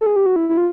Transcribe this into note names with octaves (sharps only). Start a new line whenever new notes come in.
A4
G#4
G4
F#4
E4
E4
F4